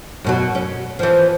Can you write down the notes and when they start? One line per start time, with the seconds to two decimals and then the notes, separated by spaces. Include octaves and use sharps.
0.24 F#2 B2 F#3
0.55 C#4
0.99 E3 F3